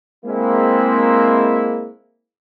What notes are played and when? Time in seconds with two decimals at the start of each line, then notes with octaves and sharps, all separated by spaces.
0.25 G#3 A#3 C4 E4